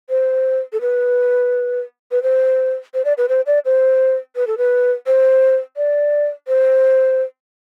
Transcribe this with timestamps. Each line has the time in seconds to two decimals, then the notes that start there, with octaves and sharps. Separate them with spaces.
0.10 C5
0.73 A4
0.81 B4
2.11 B4
2.23 C5
2.94 C5
3.05 D5
3.18 B4
3.29 C5
3.47 D5
3.65 C5
4.36 B4
4.47 A4
4.58 B4
5.07 C5
5.77 D5
6.48 C5